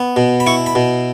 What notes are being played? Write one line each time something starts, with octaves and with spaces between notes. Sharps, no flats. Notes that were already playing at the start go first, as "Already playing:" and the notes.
Already playing: B3
B2
B5
E4 C#6
B5
B2